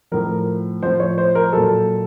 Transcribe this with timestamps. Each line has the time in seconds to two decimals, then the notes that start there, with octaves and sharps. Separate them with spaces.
0.12 A2 F3 A#4
0.83 A2 F3 C5
1.00 C#5
1.18 C5
1.35 A#4
1.53 A#2 F#3 A4